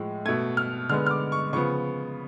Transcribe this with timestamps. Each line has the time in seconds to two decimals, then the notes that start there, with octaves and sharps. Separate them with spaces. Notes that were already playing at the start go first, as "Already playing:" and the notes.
Already playing: A2 F3 G#3
0.25 B2 A3 G#6
0.57 F6
0.89 D3 G#3 B3 F6
1.06 F6
1.11 D6
1.32 C#6
1.53 C#3 F3 B3 C#6